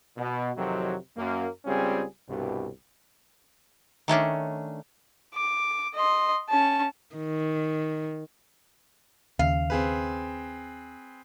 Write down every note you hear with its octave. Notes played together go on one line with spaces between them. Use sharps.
B2
F2 C3 D#3 F#3
F#2 A#3
C#2 G3 C4 C#4 F4 G#4
C2 G2 B2
D#3 A3 C#4 D4
D6
D#5 C6
C#4 A5
D#3
D#2 C#3 F5
C4 G#4 B4